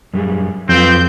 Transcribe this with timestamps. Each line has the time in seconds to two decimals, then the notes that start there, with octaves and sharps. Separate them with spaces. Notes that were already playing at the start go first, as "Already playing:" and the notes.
0.14 F#2 G3 G#4
0.69 F2 F#3 C4 F4 B4 G6